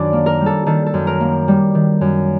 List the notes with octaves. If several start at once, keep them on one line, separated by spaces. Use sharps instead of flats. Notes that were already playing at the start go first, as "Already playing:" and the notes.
Already playing: F#2 D#3 D4 D5
A#3
A#4
G3
A4
D#3 A4
A4
F#2
A#4
A#3
G3
D#3
F#2